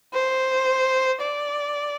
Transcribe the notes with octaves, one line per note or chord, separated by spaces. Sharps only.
C5
D5